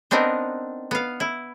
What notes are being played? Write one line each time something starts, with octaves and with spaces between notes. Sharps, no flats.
B3 C4 D4 D#4 A#4
B3 F5
E4